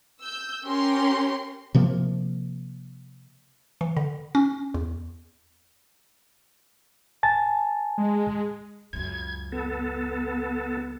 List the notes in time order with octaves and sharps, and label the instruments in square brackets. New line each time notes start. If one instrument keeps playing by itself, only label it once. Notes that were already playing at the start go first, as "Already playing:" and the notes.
[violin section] E6 G6
C#4 G4 A#4 C6
[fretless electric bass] C3 F3 A#3
[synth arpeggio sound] E3
D3
C#4
E2
[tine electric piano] G#5 A5 A6
[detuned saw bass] G#3
[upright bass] C#2 F#2 [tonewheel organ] G#6
[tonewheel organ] B3 A4